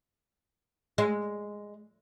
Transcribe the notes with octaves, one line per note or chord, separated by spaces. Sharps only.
G#3